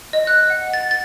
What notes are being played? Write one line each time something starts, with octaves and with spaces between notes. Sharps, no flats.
D#5
F#6
F#5
A6
A6